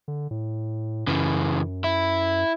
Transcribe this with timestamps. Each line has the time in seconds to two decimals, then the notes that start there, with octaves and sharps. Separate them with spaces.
0.08 D3
0.31 A2
1.07 F#2 C#3 E3
1.84 E4